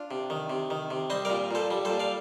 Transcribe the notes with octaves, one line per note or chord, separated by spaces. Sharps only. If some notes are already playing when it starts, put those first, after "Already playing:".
Already playing: D4 F4
C3
D#3
C3
D#3
C3
G3 C5 D#5
A#2 A#4 D5
A#2 A4 C5
G3
A#2 A4 C5
D5 F5